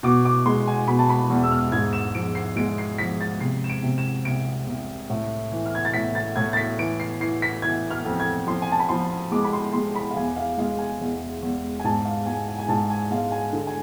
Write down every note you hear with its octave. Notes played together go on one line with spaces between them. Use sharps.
B2 D6
D6
G#3 C6
G#5
B2 B5
A5
B5
E2
E6
F6
G#2 G#6
E7
F3 D7
C7
G#3 D7
C7
F3 B6
A6
C3 C7
E7
D7
C3
E7
C2 D7
C2
A2
E3
F6
G#6
A6
A2 B6
A6
A2 G#6
A6
B6
E3 D7
C7
E3 C7
B6
E3 G#6
F6
F2
G#6
F3 C6
G#5
A5
B5
F3 C6
G#3 D6
B5
C6
G#3 C6
B5
F5
E2 G#5
F5
G#3 F5
G#5
E2
E2
G#5
G#2 A5
F5
G#3 G#5
G#5
G#5
G#2 A5
G#5
G#3 F5
G#5
D3
G#5